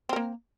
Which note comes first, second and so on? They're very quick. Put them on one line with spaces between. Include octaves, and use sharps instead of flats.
C4 A#4 A#3